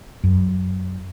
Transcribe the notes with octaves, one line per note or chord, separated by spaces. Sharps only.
F#2